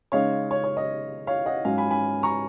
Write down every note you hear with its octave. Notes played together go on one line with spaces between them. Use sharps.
C#3 G#3 D#4 C#5 F5
C#5
C#5
D#5
C#5 F5
D#5 F#5
G#2 F#3 C#4 F5 G#5
G#5 B5
G#5 B5
A#5 C#6